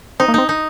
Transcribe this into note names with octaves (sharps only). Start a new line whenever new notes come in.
C4 D#4
A#3
C4 D#4
D#4